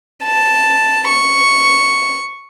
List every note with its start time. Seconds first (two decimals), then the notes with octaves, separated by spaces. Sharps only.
0.23 A5
1.09 C#6